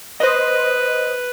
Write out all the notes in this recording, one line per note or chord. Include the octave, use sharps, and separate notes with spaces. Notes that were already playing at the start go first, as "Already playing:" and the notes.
B4 C5 D#5